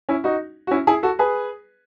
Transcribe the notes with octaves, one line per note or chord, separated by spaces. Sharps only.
C#4 E4
D#4 F#4
F#4
C#4 E4
E4 G#4
F#4 A4
G#4 B4